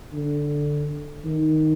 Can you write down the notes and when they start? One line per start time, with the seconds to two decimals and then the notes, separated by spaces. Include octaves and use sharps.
0.13 D3
1.25 D#3